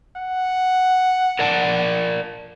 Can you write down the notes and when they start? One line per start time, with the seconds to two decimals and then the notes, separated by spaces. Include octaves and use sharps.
0.16 F#5
1.39 A#4 D5 A5